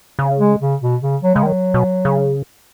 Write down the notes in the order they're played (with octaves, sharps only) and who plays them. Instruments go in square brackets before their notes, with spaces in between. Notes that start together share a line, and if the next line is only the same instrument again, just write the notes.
[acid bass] C#3
[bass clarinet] G#3
C#3
B2
C#3
F#3
[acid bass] C#3 [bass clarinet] G#3
[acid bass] D#3 [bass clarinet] F#3
[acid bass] B2
C#3